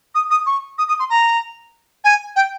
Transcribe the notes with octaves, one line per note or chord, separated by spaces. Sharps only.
D#6
D#6
C#6
D#6
D#6
C6
A#5
G#5
G5